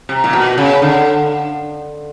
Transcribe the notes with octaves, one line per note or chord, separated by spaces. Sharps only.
C3
A#2
B2
C#3
D3